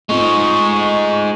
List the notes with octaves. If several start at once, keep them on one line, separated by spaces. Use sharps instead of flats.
G#3 A3 C4 D#4 F4 C#6